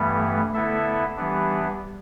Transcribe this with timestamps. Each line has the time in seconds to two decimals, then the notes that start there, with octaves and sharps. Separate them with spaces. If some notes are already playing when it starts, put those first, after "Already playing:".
Already playing: G2 E3 G3 A3 B3
0.54 D3 B3 E4 A4 E5
1.17 E3 G3 B3 D4